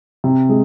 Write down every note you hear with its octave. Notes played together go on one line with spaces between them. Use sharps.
C3
G#3